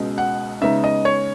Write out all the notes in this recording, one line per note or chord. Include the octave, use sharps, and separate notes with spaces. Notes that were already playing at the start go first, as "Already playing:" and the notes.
Already playing: C#2 B2 G#3
F#5
C#3 G#3 B3 D#4 E5
D#5
C#5